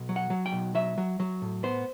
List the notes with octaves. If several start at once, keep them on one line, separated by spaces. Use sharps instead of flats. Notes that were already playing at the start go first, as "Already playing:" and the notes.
Already playing: B1
F#3
F#5
F#3
G5
B1
F#3 E5
F#3
F#3
A2
B3 C5